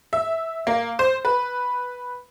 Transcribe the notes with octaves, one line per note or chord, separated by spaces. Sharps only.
E5
A#3
C5
B4